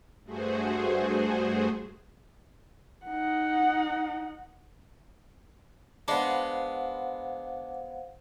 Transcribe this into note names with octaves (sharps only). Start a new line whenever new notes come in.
G2 A3 F#4 G#4 C5
D#4 F#5
G#3 B3 D4 C5 F5 F#5